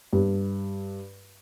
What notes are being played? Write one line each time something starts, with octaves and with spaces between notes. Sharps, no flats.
G2